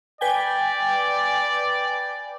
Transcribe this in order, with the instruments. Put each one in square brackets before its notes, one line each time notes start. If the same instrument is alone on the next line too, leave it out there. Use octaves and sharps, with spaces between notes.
[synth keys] B4 G5 G#5 [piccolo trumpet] D5